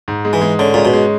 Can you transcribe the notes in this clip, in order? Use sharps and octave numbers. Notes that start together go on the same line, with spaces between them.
G#2
G#3
E3
G#3
D3 C#4
A#2 G#3
B2
G#3